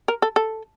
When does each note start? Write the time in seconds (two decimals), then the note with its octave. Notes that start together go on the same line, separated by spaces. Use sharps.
0.08 A#4
0.22 A4
0.36 A4